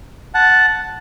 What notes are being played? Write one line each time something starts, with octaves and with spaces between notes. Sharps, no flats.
F#5 A5